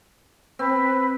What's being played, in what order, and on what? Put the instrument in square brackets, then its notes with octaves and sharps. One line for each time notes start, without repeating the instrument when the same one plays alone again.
[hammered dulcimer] C4 [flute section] B4 B5